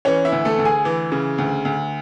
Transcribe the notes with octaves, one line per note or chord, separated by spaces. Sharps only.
E3 C#4 C#5
E4 E5
D2
A3 A4
D2
G#4 G#5
E3
C#3
D2
D2